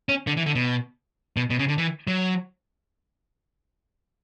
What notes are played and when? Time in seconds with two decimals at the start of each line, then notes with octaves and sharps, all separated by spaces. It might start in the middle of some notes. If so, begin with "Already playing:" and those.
0.09 C#4
0.27 D3
0.37 E3
0.46 D3
0.55 B2
1.37 B2
1.50 B2
1.59 C#3
1.68 D3
1.78 E3
2.07 F#3